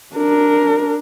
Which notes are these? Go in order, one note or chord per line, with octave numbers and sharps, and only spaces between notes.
D4 A#4